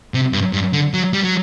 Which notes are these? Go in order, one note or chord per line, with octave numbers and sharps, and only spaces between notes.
C3
G2
G2
D3
F#3
G3
F#3